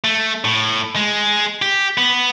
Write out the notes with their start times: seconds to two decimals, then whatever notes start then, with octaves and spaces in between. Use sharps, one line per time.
0.04 A3
0.44 A2
0.96 G#3
1.62 G4
1.98 B3